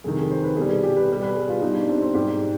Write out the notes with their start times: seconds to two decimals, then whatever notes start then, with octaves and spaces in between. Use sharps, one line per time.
0.04 F2 C3 D#3 G#4
0.17 G#4
0.30 C5
0.43 B4
0.56 B2 G3 G#4
0.70 G#4
0.83 G4
0.96 B4
1.09 B2 G3
1.22 B4
1.36 G#4
1.49 F4
1.62 B2 G3 D#4
1.75 D4
1.89 C4
2.02 C4
2.14 G#2 G3 G4